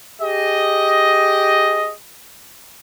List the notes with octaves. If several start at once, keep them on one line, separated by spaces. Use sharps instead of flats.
G4 G#4 D#5